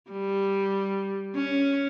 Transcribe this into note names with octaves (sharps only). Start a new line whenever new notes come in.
G3
C#4